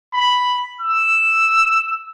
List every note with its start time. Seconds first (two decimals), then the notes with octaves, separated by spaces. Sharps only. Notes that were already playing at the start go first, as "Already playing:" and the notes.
0.14 B5
0.81 E6